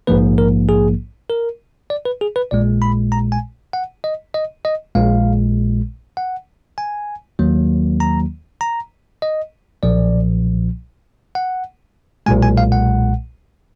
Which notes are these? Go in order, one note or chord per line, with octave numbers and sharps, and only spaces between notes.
A#1 G#2 F3 A#3 B4
A#4
G#4
A#4
D5
B4
G#4
B4
A#1 A#2 G#3 D5
B5
A#5
G#5
F#5
D#5
D#5
D#5
A#1 A#2 G#3 F5
F#5
G#5
D#2 D#3 F#3 A#3
A#5
A#5
D#5
B1 A#2 F3 D5
F#5
B1 A#2 G#3 G#5
G#5
F5
F#5